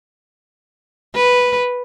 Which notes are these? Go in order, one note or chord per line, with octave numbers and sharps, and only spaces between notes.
B4